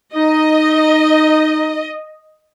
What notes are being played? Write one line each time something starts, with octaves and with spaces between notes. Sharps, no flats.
D#4 D#5